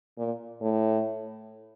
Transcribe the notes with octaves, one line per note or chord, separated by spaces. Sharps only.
A#2
A2